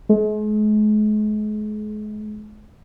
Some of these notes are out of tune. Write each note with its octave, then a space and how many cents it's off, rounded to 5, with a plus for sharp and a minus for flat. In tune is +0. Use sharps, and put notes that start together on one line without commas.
G#3 +40